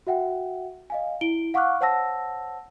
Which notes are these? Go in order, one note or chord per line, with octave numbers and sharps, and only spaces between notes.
F#4 E5 F#5 G5
D#5 F5 G#5
E4 D7 G7
F5 F#5 C#6 D6 F6 F#6
C5 C#5 F#5 A5 E6 A#6